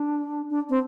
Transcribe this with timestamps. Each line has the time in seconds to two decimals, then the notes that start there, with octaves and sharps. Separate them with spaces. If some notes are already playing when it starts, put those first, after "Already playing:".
Already playing: D4
0.50 D4
0.70 C4